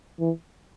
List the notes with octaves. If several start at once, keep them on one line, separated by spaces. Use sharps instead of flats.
E3